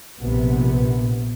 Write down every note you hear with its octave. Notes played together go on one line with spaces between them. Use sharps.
A#1 C3 B3